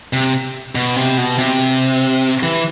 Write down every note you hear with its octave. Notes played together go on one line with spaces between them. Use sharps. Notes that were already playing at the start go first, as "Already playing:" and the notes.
C3
B2
C3
B2
C3
E3